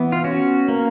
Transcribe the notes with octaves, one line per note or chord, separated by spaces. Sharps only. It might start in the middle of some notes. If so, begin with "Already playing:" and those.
Already playing: E3 B3
F4
C#4 F#4
A#3